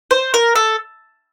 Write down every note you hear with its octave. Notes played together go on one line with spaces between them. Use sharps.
C5
A#4
A4